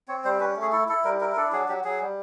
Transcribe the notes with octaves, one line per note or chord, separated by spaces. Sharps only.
C4 C#5
G3 C5
C#4 B4
A3
G#4
E4 A4
E4 A4
G3 A#4
E4 A#4
A#4
D4 A4
F#3 G#4
F#3 G4
F#3 G#4
G3